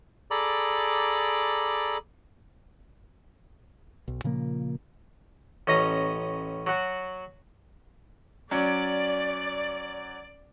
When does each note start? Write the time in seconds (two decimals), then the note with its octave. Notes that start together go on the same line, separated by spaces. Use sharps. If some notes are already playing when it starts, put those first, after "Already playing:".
0.31 G#4 A4 D5 A#5 B5 D6
4.08 B1
4.24 A#2 C#3 F3 A#3
5.67 A1 C#4 D#5 A#5 D#6
6.67 F#3 F#4
8.51 F#3 C#4 D5